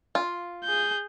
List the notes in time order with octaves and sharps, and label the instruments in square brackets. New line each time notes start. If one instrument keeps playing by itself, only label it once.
[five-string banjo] F4
[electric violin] G#4 G6